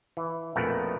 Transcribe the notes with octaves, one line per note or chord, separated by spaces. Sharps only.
E3
A#1 F2 B2 A3 A#4 F#5